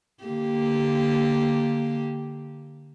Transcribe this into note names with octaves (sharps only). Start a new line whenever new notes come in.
D3 A#3 G4